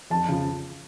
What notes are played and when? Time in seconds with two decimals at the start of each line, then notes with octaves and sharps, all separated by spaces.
0.10 F2 A5
0.28 C#3 F3